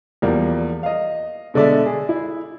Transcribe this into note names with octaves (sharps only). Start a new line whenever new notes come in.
E2 F3 G3 A#3
D#5 F5
B2 D3 G#3 D5 E5
G#4
E4